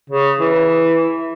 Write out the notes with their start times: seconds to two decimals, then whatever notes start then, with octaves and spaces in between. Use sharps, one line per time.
0.10 C#3
0.39 E3